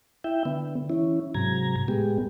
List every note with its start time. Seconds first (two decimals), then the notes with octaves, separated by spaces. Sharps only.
0.24 E4 E5 G5
0.45 D3 B3
0.90 E3 C#4 E4
1.34 G#2 C3 F#3 A#5 G#6
1.88 A2 G#3 B3 G4